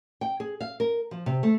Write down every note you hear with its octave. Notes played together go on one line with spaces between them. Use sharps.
G5
G#4
F5
A#4
F3
C3
A3